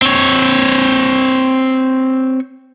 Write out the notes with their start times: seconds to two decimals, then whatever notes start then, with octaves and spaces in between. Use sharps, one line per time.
0.02 C4 C#5